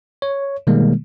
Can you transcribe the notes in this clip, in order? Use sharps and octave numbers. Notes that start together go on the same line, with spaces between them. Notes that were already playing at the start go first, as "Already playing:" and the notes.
C#5
B2 D#3 G3 G#3 A#3